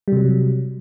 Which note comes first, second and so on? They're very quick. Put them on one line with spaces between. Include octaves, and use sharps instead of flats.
G3 C3 F#3